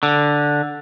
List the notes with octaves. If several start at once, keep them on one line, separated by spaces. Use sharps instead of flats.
D3